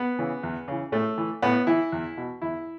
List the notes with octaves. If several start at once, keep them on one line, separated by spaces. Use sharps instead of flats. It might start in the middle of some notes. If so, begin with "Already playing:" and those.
Already playing: B3
C#3 E3
E2
C#3 E3
A2 A3
E3
A2 B3
E3 E4
E2
B2
E2 E4